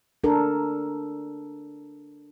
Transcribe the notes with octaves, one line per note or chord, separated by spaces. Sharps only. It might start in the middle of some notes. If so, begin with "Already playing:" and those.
D4 A4 A#4